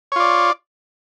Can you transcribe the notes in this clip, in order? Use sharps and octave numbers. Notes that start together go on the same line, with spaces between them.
F4 C#5 D5